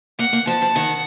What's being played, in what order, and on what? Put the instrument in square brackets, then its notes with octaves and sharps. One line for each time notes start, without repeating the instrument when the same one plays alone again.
[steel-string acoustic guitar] A#3 [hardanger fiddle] F#5
[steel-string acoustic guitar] A#3
[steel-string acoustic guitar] F3 [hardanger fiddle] A5
[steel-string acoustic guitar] F3
[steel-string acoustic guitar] D#3 [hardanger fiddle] F#5